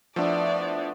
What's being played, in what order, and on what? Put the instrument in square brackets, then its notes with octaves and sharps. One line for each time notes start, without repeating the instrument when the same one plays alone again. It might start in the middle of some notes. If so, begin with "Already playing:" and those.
[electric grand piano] F3 D4 [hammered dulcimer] A3 B3 E4 [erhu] D5